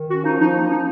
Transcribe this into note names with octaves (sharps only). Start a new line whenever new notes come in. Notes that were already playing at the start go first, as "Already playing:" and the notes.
Already playing: D#3
C#4 F#4
F3 D#4
F3 D#4
A#3 D#4
C#4 D#4